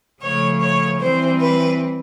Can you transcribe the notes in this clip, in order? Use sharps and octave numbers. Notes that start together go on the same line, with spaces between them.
C#3 F3 A3 C#5
C#5
E3 G3 C4 C5
B4